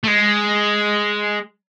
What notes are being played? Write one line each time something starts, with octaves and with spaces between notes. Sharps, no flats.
A3
G#3